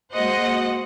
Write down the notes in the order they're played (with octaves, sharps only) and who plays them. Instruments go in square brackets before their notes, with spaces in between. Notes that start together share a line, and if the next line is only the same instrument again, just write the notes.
[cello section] G#3 A#3 F#4 [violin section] C5 D#5 F#5